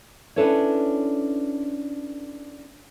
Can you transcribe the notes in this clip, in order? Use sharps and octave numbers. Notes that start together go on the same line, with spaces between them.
C#4 D4 E4 A4 B4 C#5